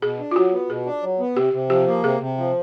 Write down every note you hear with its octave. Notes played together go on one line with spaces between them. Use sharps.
B2 G#4
D4
F4
F#3 F#4
B3
B2 G#4
D4
F#3
B3
C3 G4
C3
F3 G4
A#3
C3 G#4
C3
F3